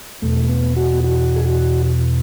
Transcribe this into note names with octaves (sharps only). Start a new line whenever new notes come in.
E2 B2 A3
B3
F#4
F#4
G#4
F#4